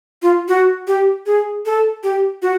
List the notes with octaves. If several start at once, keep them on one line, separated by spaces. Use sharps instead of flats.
F4
F#4
G4
G#4
A4
G4
F#4